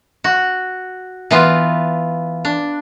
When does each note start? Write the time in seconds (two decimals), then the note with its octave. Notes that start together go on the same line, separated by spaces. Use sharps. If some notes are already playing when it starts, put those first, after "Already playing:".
0.24 F#4
1.31 E3 B3 F4
2.45 D4